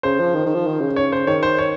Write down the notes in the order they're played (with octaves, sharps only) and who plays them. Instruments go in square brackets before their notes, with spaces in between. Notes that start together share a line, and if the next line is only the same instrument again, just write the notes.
[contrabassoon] C#3 [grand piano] C5
[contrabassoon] F3
D#3
D#3
F3
D#3
C#3
[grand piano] C#5
C5
[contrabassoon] D#3 [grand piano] C#5
[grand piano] C5
C#5